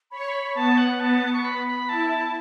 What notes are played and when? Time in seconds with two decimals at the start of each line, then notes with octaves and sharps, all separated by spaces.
0.11 C#5 B5
0.20 C#6
0.28 B5
0.55 B3 A5
0.78 F#5
1.00 B3 A5
1.33 C#6
1.44 B5
1.66 B5
1.88 E4 A5